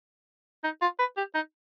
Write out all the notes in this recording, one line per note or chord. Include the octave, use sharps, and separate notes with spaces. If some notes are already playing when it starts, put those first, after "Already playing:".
D#4
F4
B4
G4
D#4